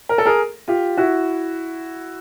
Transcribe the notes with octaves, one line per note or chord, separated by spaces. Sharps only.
A#4
A4
G#4 A#4
F4 G4
E4 F#4